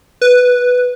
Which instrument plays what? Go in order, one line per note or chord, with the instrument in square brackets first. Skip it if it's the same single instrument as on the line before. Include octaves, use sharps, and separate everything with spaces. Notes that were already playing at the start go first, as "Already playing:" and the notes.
[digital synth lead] B4